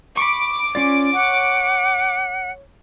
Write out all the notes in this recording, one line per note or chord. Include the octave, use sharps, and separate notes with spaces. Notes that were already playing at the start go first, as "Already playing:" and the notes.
B5 C#6 D6
C#4 F4 D5
C#5 F#5